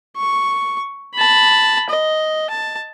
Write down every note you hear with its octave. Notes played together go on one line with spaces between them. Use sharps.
C#6
A5 B5
D#5
A5